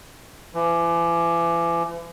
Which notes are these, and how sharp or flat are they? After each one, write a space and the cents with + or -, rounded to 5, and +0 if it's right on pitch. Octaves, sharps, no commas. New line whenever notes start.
E3 +40